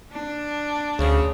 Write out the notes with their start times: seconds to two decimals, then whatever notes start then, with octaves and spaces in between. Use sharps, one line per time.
0.12 D4
0.99 D2 C#3